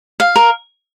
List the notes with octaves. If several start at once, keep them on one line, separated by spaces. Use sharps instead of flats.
F5
A#4